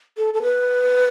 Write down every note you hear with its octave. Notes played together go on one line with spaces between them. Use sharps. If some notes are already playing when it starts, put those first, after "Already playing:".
A4
A4
B4